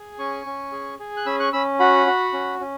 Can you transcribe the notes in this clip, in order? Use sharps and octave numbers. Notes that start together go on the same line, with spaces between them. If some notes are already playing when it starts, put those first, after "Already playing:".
Already playing: G#4
C#4 G#5 C#6
C#4
G#4
G#4
F#6
C#4 B5 E6
C#6 F#6
C#4 B5 E6
F#4 F#5 B5
F#4
C#4
C#4